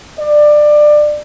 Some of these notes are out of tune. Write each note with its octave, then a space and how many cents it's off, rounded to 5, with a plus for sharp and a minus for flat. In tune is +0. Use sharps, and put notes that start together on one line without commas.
D5 +20